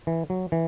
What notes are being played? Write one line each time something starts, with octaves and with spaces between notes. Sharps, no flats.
E3
F#3
E3